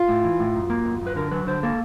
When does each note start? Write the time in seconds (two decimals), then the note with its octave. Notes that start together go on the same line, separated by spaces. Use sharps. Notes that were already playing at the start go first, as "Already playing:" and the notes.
Already playing: F4
0.08 A2
0.24 E3
0.39 A2
0.55 F#2
0.70 A#3
0.85 F#2
1.01 F#2
1.07 B4
1.16 D3 A#4
1.31 F#3 B4
1.47 D3 C5
1.63 A#3 A4